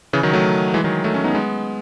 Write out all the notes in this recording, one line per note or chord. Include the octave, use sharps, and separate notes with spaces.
C#3 E3
D#3 F#3
F#3 A3
E3 G#3
D#3 F#3
F#3 A3
A3 C#4
B3 D#4
G#3 B3